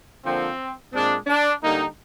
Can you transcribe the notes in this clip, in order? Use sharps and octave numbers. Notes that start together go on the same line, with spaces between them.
D3 F3 A#3 C4
A#2 G#3 C4 D4
D4
D3 G3 A#3 D#4